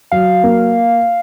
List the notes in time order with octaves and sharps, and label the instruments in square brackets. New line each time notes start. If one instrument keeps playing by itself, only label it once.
[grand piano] F#3 [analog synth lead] F5
[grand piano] A#3